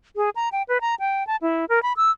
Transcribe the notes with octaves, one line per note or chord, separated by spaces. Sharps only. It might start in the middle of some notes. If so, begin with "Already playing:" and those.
G#4
A#5
G5
B4
A#5
G5
A5
E4
A#4
B5
E6